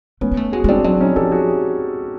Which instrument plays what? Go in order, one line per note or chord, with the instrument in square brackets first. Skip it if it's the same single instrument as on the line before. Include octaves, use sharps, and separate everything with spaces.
[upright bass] A3 [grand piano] B3 C#4
[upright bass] A#3
A3
[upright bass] G#3 [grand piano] F#4 G#4
[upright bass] G#3
[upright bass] G3 [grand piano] C4 D4
[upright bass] F#3 [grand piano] C4 D4
[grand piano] C#4 D#4
[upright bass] F3 [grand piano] G4 A4
[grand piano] F#4 G#4